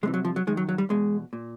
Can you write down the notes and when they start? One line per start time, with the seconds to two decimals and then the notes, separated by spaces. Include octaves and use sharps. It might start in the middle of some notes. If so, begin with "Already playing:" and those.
0.03 C2 C3 E3 G#3
0.14 F#3
0.25 F3
0.36 F#3
0.47 F#2 D#3 G#3
0.57 F#3
0.69 F#3
0.78 G3
0.89 E2 B2 G#3
1.33 A#2